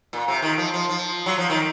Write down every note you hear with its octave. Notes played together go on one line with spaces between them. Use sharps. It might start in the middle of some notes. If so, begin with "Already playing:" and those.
A#2
C3
D#3
F3
F3
F3
F#3
F3
D#3